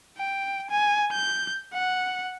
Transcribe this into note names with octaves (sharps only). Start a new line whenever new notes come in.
G5
G#5
G6
F#5